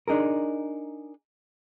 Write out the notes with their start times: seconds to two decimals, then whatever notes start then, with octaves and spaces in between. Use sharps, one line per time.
0.08 D4 D#4 G#4 A#4